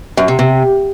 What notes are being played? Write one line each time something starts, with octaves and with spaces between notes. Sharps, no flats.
F#2
C3
C3